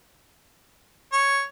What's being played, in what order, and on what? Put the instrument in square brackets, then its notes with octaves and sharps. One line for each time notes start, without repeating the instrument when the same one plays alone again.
[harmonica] C#5